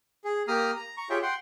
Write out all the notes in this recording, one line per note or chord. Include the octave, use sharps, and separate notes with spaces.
G#4
A#3 G4 A#5 D#6 F6
A#5
A#5 C#6
F4 G4 G#4 C#5 E5 G5
F#5 G5 C6